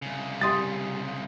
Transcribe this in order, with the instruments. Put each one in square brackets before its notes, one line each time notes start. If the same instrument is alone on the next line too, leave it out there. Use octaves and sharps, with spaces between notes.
[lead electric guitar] C2 C#3
[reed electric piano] G3 G4 [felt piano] C6 D#6 A6